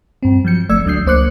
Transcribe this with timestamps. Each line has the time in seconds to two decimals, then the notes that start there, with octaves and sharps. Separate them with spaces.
0.23 G2 C4
0.45 F3 F#3 G6 C#7
0.69 G1 A3 D5 E6 G#6
0.85 D2 F#3 D4 D#6 G6 C7
1.06 C#2 A#3 C5 D6 F#6 C#7